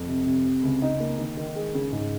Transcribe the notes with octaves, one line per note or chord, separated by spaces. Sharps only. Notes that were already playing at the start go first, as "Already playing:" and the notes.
Already playing: F2
C3
C3
C3
C#2
D#4
A#3
D#3
D#3
G#3
C#3
G#2